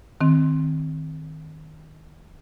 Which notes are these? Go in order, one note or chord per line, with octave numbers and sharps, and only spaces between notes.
D#3 C4